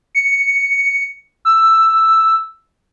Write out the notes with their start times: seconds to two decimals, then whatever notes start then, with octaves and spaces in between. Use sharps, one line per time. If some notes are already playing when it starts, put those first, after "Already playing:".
0.15 C#7
1.45 E6